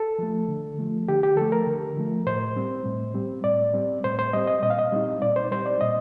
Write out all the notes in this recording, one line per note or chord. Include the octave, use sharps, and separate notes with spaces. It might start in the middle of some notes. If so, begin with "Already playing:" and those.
Already playing: A4
F3 A3
D3
F3 A3
D3 G4
G4
F3 A3 A4
A#4
D3
F3 A3
A2 C5
G3 C4
A2
G3 C4
A2 D5
G3 C4
A2 C5
C5
G3 C4 D#5
D#5
A#2 D#5
F5
D#5
G3 C4 D#4
A#2 D5
C5
G3 C4 D#4 C5
D5
A#2 D#5